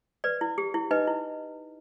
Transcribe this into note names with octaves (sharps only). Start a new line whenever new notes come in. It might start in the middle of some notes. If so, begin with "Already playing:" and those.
B4 D5
E4
G4
E4
D#4 B4 D#5
E4